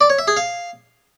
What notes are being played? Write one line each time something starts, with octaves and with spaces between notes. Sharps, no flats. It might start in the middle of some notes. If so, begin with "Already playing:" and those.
D5
C#5
E5
G#4
F5